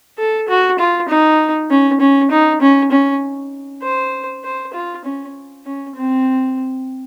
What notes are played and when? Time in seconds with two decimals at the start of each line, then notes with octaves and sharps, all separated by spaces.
0.18 A4
0.48 F#4
0.79 F4
1.09 D#4
1.70 C#4
2.00 C#4
2.31 D#4
2.61 C#4
2.91 C#4
3.83 C5
4.44 C5
4.73 F4
5.05 C#4
5.65 C#4
5.95 C4